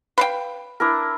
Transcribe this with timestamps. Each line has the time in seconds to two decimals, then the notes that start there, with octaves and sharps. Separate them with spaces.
0.18 B4 F5 G5
0.80 D4 E4 A#4